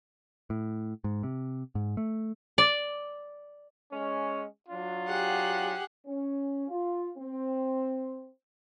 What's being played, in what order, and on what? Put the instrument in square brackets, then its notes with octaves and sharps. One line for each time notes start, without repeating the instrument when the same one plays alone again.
[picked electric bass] A2
G#2
C3
G#2
A3
[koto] D5
[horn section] G#3 C#4
F#3 D4 F4
[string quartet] G4 G#4 F#5
[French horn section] C#4
F4
C4